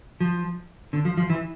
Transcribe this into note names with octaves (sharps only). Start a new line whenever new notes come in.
F3
D3
F3
F3
E3